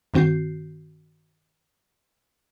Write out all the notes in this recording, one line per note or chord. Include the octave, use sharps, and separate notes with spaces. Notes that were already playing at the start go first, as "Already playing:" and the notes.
G2 D#3 C4 F#4 G6 C7